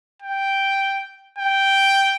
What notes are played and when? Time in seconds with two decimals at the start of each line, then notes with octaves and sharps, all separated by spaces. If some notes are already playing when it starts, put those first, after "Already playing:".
0.22 G5
1.38 G5